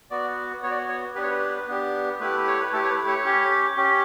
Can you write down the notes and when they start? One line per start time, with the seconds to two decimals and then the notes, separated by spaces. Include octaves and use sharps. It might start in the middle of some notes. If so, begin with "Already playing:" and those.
0.10 B3 F#4 D5
0.63 B3 C#5
0.66 F#4 D5
0.78 C#5
0.89 C#5
1.15 B3 D4 G4 B4
1.23 C#5
1.30 B4
1.68 B3 D4 G4
2.20 A3 E4 G4 B4
2.47 C#5
2.61 B4
2.73 A3 E4 G4 A4
2.84 C#5
2.91 B4
3.07 C#5
3.25 C#4 G4
3.77 C#4 G4